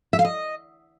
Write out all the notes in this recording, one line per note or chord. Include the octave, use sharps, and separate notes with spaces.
E5
F5
D#5